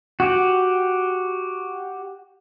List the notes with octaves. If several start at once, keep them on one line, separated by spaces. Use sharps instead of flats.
F#4 G4